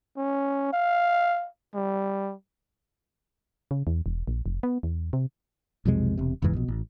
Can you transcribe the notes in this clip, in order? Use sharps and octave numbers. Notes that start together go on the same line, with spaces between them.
C#4
F5
G3
C#3
E2
E1
A#1
F1
B3
E2
C3
B1 F2 C3 G#3
E1 C3
F#1 E2 G#2 E3
A#1 B2
A1